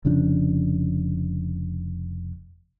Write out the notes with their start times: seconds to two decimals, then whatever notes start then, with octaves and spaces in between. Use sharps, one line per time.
0.05 F1 C#3 F3 D4